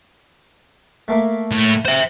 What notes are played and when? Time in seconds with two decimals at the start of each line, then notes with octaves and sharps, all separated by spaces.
1.08 A3 A#3 E5
1.52 A2
1.85 C5 E5